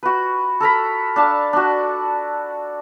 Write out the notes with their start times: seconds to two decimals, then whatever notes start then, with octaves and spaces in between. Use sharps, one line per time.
0.03 F#4 B4
0.60 A4 A#4 A#5 B5
1.16 D4 F5 A5
1.53 D4 F#4